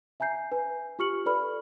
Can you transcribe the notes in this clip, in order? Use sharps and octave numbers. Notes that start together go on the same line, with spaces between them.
E5 G#5 A#5 G6 C7
B4 G#5
F4 G4 C#6 F6 C#7 F#7
A4 B4 D5 B5 F6